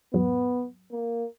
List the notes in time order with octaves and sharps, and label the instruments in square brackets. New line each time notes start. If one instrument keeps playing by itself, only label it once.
[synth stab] E2 G#2 F#3 [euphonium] B3
[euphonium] A#3